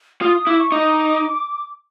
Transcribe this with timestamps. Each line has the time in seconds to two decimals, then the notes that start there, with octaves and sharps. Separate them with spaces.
0.21 F4 D#6
0.47 E4 D6
0.59 C#6
0.71 D#4 D6